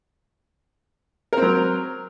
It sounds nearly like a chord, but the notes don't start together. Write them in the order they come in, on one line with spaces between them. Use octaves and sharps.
A#4 C4 F#3